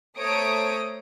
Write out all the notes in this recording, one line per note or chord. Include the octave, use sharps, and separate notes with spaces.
A3 C5 C#5 A#5 D#6 D7